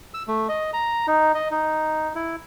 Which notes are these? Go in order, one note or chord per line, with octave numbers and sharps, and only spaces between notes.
E6
A3
D#5
A#5
D#4
D#5
D#4
E4